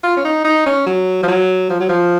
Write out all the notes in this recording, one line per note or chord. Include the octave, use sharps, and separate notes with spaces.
F4
C#4
D#4
D#4
C#4
F#3
F3
F#3
F3
F#3
F3